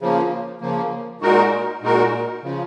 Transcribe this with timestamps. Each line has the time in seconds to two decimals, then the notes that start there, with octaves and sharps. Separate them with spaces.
0.01 C#3 F3 A#3
0.61 C#3 F3 A#3
1.21 A#2 G#3 D#4 F#4 A#4
1.82 A#2 G#3 D#4 F#4 A#4
2.43 C#3 F3